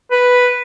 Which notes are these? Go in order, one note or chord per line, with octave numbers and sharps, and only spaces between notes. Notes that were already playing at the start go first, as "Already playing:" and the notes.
B4